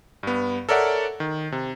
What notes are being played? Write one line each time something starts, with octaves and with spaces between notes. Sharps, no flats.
G2 B3
A4 A#4 C#5 D5 E5 F#5
D#3
C3